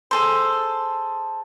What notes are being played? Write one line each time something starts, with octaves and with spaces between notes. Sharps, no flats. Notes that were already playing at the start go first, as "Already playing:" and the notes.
G#4 A4 C5